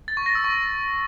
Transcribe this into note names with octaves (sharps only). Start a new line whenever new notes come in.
A6
C#6
A#6
E6
C#6